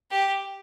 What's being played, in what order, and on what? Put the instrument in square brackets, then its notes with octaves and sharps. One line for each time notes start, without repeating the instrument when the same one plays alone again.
[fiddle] G4